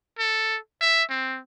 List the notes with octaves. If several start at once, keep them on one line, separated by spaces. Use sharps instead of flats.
A4
E5
C4